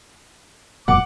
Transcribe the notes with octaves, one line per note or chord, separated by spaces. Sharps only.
E1 F#2 A#2 F#5 D6